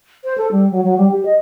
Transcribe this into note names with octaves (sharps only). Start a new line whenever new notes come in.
C5
A4
G3
F#3
F#3
G3
G4
D#5